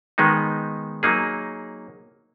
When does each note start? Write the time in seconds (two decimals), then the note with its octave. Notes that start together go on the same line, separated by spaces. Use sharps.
0.18 D#3 G#3 B3 D#4
1.03 F#3 A#3 D#4 G#4